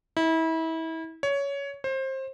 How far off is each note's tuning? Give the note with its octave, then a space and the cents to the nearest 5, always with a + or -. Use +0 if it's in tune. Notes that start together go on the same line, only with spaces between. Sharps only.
E4 -30
C#5 +15
C5 +25